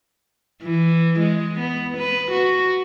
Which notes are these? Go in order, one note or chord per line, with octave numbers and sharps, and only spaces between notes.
E3
G#3
B3
B4
F#4